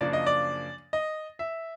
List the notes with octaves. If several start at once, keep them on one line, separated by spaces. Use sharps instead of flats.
F#2 C#3 F3 A#3 D4 D5
D#5
D5
D#5
E5